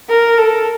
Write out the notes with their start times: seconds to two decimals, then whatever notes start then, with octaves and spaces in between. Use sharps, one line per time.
0.09 A#4
0.38 A4